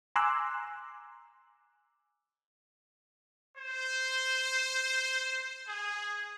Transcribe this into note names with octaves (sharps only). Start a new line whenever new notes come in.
G#5 A#5 C6 D6 E6 F#6
C5
G#4